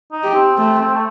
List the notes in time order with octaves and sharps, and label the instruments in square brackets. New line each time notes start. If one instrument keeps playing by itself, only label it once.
[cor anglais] D#4
[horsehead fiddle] G4
[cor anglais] C4
[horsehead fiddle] A3 [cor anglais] C4
[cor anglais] C4
A3